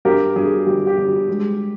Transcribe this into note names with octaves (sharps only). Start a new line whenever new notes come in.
G2 G4 A#4
G2 G#4
G1 G4
G4
G1
G#3